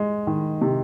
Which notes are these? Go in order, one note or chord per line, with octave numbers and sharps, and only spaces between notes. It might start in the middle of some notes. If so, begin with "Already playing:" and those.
Already playing: G#3
D#3
C3